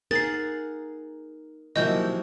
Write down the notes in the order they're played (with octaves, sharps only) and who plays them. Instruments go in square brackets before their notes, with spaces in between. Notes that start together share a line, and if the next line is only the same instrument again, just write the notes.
[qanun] D#4 G#4 F#5 [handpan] A#4 [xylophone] A6 C7
[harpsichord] B1 C3 F#4 [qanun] E3 F3 A#3 [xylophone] D#5 G6